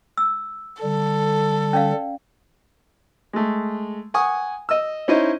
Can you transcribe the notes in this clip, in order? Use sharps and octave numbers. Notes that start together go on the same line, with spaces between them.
E6
D3 G3 A4
C#4 D5 F5
G#3 A3
F#5 G#5 C#6 D#6
D#5 E6
C#4 D#4 E4 C5 D#5